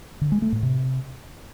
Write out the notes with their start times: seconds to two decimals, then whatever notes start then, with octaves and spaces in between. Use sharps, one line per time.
0.21 D3
0.32 G#3
0.42 A3
0.52 A2
0.63 C3